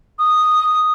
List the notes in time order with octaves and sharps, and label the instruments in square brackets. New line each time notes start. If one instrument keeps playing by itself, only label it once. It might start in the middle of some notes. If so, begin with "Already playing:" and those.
[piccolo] D#6